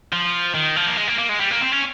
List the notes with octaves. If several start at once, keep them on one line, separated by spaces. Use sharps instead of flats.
F3
D#3
F3
A#3
G#3
A#3
A#3
G#3
G3
A#3
C4
C#4